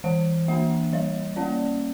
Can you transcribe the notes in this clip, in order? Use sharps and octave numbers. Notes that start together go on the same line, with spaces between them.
E3 F#5
A#3 D4 E5
G3 C#5
A#3 C#4 D5